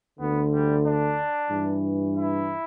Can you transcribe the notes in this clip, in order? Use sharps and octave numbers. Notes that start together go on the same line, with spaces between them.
D2 D3 B3
G3
D4
G2 E3
E4